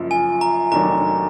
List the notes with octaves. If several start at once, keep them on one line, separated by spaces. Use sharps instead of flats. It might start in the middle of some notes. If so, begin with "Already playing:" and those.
Already playing: F#1 F#2 F3
G#5
A#5
F1 D#2 D#3 F#3 D4 A#5